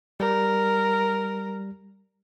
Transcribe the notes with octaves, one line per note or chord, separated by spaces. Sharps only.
G3 A#4